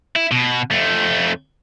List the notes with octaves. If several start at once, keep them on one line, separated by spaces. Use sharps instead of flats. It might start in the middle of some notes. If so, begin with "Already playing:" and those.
E4
B2
F2 A3